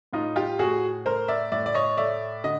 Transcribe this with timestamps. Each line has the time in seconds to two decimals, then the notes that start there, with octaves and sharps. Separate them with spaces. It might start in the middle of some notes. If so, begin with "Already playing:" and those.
0.13 A2 D#4 F4
0.36 F4 G4
0.59 A2 F#4 G#4
1.05 A3 A#4 C5
1.28 D5 E5
1.52 A2 D5 E5
1.66 D5
1.74 C#5 D#5
1.97 A3 D5 E5
2.44 D3 D#5